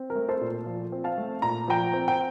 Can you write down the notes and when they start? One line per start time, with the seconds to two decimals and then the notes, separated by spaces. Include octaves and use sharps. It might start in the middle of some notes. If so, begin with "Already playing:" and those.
Already playing: C4
0.10 A#4
0.15 A3
0.29 A4 C5
0.41 A#2
0.66 F3
0.92 C4
1.04 F5 A5
1.18 A3
1.42 A#2 A#5
1.68 F3 G5 A#5
1.93 C4
2.08 G5